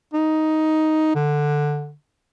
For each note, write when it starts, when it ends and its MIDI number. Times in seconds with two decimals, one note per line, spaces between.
0.13 1.13 63
1.15 1.93 50